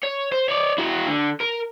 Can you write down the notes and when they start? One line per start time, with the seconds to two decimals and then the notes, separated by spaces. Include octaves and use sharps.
0.03 C#5
0.32 C5
0.48 C#5 D5
0.78 E4 F#4
1.07 D3
1.41 A#4